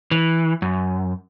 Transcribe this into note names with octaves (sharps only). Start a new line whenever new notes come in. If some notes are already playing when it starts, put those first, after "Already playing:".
E3
F#2